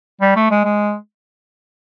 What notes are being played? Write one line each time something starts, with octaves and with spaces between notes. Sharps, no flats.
G3
A3
G#3
G#3